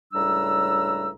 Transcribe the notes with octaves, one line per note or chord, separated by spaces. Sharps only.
C#2 A2 G3 D4 A#5 E6